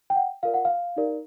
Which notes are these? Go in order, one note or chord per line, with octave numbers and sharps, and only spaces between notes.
G5
F#5
F4 A#4 D5 F5
F#5
F5
D#4 G4 A#4 D5